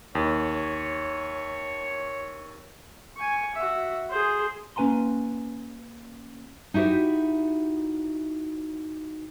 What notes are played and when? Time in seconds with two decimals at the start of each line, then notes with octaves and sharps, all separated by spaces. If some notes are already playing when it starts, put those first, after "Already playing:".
0.15 D#2 C#5
3.17 G#5 C#6
3.55 F#4 E5
4.10 G#4 C5
4.76 A#3 C#4 B4 G#5 A#5 C6
6.74 D#4 E4 F#4 G4 C5